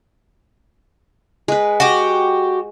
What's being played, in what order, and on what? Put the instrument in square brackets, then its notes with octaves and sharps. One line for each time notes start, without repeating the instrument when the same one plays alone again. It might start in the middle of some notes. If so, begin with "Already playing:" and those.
[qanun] G#3 B4
[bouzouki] F#4 G4